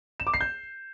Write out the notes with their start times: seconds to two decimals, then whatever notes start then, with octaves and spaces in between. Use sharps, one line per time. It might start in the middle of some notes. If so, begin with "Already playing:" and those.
0.20 E7
0.27 D6
0.34 C7
0.41 G6